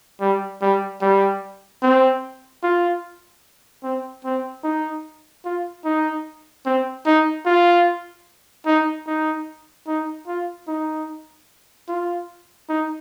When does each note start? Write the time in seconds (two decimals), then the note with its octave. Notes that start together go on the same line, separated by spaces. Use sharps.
0.21 G3
0.62 G3
1.01 G3
1.82 C4
2.63 F4
3.83 C4
4.24 C4
4.63 D#4
5.45 F4
5.85 D#4
6.66 C4
7.06 D#4
7.46 F4
8.66 D#4
9.07 D#4
9.87 D#4
10.27 F4
10.68 D#4
11.88 F4
12.69 D#4